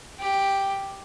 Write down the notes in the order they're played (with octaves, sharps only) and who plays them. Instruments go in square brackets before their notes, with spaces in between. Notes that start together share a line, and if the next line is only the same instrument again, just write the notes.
[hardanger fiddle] G4